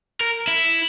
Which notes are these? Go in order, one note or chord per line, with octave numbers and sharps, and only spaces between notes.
A#4
E4